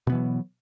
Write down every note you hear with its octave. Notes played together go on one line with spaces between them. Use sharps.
B2 E3 F#3 B3